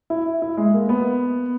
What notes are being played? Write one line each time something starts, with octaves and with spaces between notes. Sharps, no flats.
E4
E4
G#3
A#3
B3